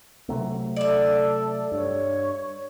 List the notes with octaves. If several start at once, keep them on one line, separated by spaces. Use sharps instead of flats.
C3 F#3 A3
A4 D5 E5
G2 C#5